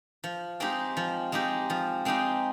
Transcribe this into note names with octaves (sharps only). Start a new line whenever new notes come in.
F3
G#3 C4 D#4 G4
F3
G#3 C4 D#4 G4
F3
G#3 C4 D#4 G4